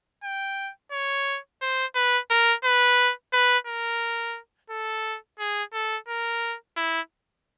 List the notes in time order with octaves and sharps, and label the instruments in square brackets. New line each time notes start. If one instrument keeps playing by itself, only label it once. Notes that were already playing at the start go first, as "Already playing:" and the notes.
[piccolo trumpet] G5
C#5
C5
B4
A#4
B4
B4
A#4
A4
G#4
A4
A#4
E4